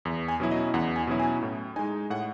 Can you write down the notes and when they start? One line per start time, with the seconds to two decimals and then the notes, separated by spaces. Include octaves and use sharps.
0.05 E2
0.28 G#5
0.40 B2 F#3 C#4 E4
0.51 D#5
0.74 E2 F#5
0.96 G#5
1.07 B2 F#3 C#4 E4
1.20 G#5
1.42 A2
1.76 G#3 D#4 G#5
2.10 A2 F#5